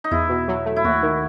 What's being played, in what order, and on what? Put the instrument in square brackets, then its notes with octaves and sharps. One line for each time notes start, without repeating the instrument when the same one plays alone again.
[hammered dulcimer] D#4
[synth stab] E2 [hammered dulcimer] E4
[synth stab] B2
F#3
A3
[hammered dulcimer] E4
[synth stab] D#2 [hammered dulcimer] F#4
[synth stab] D#3